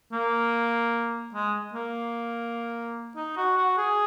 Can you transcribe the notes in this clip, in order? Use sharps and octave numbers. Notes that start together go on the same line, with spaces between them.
A#3
G#3
A#3
D#4
F#4
F#4
G#4